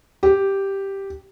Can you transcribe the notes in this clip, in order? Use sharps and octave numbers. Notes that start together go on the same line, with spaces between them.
G4